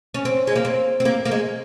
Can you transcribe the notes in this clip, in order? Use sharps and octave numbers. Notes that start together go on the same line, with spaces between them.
C#4
C4
G#3
A#3
C4
C4
A#3
A#3
G#3